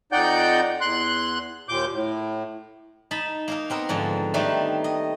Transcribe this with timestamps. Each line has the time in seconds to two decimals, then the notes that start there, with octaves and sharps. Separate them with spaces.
0.12 F2 D#4 D5 F#5 G5 G6
0.81 E2 C6 F#6
1.69 D#2 A#2 D6 G6
1.93 A2
3.11 D#4 A5 B5
3.48 A#3 D#4 A#4
3.70 B3 C4 A#4
3.89 G#2 D3 F3
4.34 D#3 G3 A3 D4 D#4
4.84 D#5